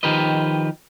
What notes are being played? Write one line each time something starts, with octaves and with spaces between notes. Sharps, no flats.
D#3 F3 G4 A#4 B4 D#5